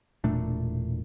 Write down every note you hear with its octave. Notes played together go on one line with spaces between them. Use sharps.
E1 A#2 A3 D4